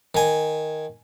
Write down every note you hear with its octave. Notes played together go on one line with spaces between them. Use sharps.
D#3 G#5